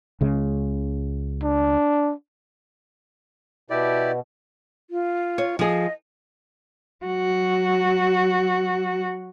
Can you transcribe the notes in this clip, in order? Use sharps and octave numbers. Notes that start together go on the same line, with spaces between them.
C#2 C#3 G#3
D4
B2 E4 G4 D5
F4
C#5
F3 G#4 D#5
F#3 F#4